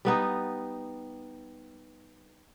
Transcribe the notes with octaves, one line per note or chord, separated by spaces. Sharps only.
G3 B3 D#4